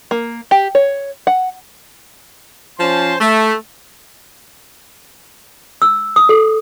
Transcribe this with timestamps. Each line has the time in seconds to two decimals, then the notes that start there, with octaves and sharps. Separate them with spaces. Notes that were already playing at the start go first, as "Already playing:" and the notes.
0.11 A#3
0.51 G4
0.75 C#5
1.27 F#5
2.79 F3 C#4 C5 A5 C6
3.21 A3
5.82 E6
6.16 D#6
6.29 A4